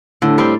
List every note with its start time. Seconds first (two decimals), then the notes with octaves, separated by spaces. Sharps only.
0.22 A2 D3
0.38 G3 C4